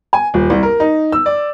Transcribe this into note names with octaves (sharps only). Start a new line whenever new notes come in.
G#5
D#1
C2
A#4
D#4
E6
D5